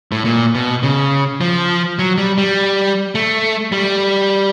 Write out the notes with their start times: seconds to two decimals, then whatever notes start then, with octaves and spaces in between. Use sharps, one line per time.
0.12 A2
0.25 A#2
0.55 B2
0.83 C#3
1.41 F3
1.99 F#3
2.18 G3
2.38 G3
3.15 A3
3.72 G3